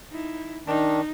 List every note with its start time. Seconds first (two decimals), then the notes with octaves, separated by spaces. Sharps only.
0.11 D#4 E4
0.67 D#3 D4 D#4